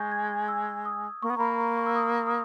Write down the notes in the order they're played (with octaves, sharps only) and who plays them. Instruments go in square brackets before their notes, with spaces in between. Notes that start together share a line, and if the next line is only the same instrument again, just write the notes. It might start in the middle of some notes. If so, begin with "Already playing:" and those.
Already playing: [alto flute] G#3 [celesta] C#6 G6
[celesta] G#6
E6
D#6
[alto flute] A#3 [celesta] C#6
[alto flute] B3
[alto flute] A#3 [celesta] A#5 B5
[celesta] C#6
C#6
E6
D#6
D#6